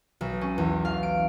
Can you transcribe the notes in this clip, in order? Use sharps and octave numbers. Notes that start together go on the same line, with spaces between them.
B1
C#4
E2
F5
D7